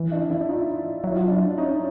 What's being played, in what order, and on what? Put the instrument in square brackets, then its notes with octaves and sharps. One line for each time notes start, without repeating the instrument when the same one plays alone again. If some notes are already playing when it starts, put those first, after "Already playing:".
Already playing: [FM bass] E3
[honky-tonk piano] D4 E4
D4 E4
D#4 F4
[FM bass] F#3 [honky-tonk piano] E4
[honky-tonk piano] F4
D4 E4
C#4 D#4